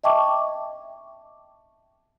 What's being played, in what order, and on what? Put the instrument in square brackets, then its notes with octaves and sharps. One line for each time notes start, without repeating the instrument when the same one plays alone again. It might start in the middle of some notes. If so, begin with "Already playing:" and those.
[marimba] D#5 E5 G5 A5 C#6 D6